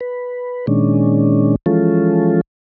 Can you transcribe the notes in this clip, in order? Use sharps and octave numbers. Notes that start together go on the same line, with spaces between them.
B4
A#2 D#3 G#3 C#4 D4
E3 F3 G#3 C#4 F4 A4